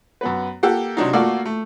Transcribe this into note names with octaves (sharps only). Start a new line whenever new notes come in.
F#2 B3 B4
A#3 G4 A4 F#5
C3 F#3 D4 D#4
A3 A#3 F4 F#4 A4 D5
A3